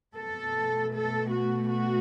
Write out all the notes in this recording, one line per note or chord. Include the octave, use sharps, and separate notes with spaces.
B2 A3 A4
A4
F#4
F#4